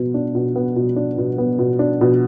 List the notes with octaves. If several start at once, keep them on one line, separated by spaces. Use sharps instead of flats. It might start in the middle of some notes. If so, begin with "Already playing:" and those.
Already playing: B2 B3
D4
B2
B3
B2
D4
B2
B3
B2
D4
B2